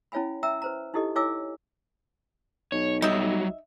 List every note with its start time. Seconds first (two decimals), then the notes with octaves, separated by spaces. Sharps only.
0.12 C#4 E4 C#5 F5 G#5 B5
0.43 E5 G5 A#5 E6
0.62 B4 C5 A#5
0.94 D#4 E4 G4 A4 D#5
1.16 E4 C#5 F5 G#5 D6 E6
2.72 B1 C#5
3.02 F#3 G3 D#4 E5